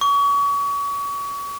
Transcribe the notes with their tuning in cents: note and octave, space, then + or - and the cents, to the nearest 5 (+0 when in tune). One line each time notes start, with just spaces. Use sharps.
C#6 +35